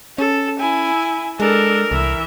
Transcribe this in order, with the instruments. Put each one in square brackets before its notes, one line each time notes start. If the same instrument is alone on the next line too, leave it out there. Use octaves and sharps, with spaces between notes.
[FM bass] C#4 [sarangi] A4
[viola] E4 [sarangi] G#5
[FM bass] G#3 [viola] D4 A4 [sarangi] A#4
[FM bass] C2 [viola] E3 E5